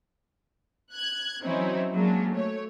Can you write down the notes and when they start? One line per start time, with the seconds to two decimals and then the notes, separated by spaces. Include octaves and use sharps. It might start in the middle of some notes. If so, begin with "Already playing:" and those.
0.92 F#6 G#6
1.42 E3 F#3 C4 C#4 D#4 E4
1.93 F#3 G#3 A#3 C#4 D4
2.30 A3 C#5